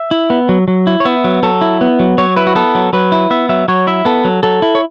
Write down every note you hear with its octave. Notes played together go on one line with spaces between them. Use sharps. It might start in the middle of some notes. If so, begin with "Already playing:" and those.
Already playing: E5
E4
B3
F#3
F#3
E4
C#5
B3 E5
F#3
F#3 A4
E4
B3
F#3
F#3 C#5
E4 B4
F#4
B3 A4
F#3
F#3 B4
E4
B3 E5
F#3 E5
F#3 C#5
E4 E5
B3 A4
F#3
F#3 A4
E4
C#5